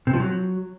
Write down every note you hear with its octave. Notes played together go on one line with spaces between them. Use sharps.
C3
F3
F#3